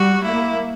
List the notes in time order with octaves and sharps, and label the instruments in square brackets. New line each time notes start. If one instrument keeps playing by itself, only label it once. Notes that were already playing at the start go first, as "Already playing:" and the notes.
Already playing: [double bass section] G3 [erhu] F#4
[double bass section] A#3 [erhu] E4